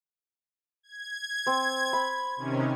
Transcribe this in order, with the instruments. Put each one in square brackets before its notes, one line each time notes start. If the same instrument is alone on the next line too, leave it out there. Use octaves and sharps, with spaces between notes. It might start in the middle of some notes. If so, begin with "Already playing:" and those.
[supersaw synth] G#6
[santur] C4
B5
[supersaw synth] C3 D#3 C#4